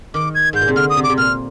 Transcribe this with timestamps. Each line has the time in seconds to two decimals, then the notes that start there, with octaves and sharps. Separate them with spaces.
0.14 D#3 D6
0.35 G#6
0.53 G#2 G6
0.61 A#2
0.68 C3
0.76 D3 F6
0.90 D#6
0.97 C3
1.04 D6
1.10 C3
1.18 A#2 F6